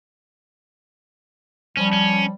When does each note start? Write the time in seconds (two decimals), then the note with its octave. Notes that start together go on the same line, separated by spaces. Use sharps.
1.77 F3 G3 C#4
1.93 C#4